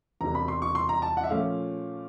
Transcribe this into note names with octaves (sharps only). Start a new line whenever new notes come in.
E1 D2 C3 A#5
B5
C6
C#6
C6
A#5
A5
F#5
E5
A#2 F3 A3 C#4 F5